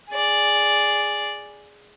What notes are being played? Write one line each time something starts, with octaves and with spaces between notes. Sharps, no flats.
G#4 D5